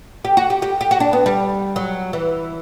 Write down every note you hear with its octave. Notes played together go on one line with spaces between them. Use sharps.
G4
F#4
G4
G4
G4
F#4
D4
B3
G3
F#3
E3